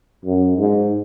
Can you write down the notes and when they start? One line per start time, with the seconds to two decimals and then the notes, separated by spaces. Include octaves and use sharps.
0.25 F#2
0.58 G#2